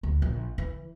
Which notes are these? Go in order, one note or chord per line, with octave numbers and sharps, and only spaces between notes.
D2
A#1
E3